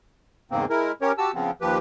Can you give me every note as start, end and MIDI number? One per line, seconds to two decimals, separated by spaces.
0.51 0.65 40
0.51 0.65 44
0.51 0.65 49
0.51 0.65 58
0.51 0.65 60
0.70 0.92 56
0.70 0.92 64
0.70 0.92 70
1.02 1.12 61
1.02 1.12 67
1.02 1.12 70
1.02 1.12 73
1.18 1.31 66
1.18 1.31 67
1.18 1.31 81
1.18 1.31 88
1.35 1.51 49
1.35 1.51 53
1.35 1.51 59
1.35 1.51 60
1.61 1.78 39
1.61 1.78 53
1.61 1.78 67
1.61 1.78 71